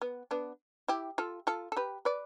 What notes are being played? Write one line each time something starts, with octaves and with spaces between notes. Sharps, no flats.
B3
B3 D4
E4 G4
F4 A4
F4 A4
A4
G4 B4
B4 D5